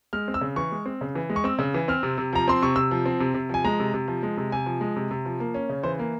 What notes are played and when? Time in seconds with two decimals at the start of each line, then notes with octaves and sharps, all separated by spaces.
0.13 G#3 F6
0.28 C4
0.34 E6
0.41 C#3
0.56 E3 C#6
0.72 G#3
0.86 C4
1.01 C#3
1.15 E3
1.30 G#3
1.36 C#6
1.44 C4 E6
1.59 C#3
1.74 E3
1.88 C4 F6
2.03 C3
2.18 C3
2.33 F3 A#5
2.48 C4 C6
2.62 C3 C#6
2.76 C3 E6
2.91 F3
3.06 C4
3.20 C3
3.34 C3
3.49 F3 G#5
3.65 G#3 A#5
3.80 C3
3.94 C3
4.08 F3
4.23 G#3
4.37 C3
4.52 C3 G#5
4.66 F3
4.81 G#3
4.96 C3
5.11 C3
5.25 F3
5.40 A#3
5.54 C#4
5.69 C#3
5.83 E3 C5
5.99 A#3